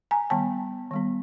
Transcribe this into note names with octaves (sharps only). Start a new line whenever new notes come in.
G#5 A#5
D#3 G3 B3 G5 A5
D#3 G3 B3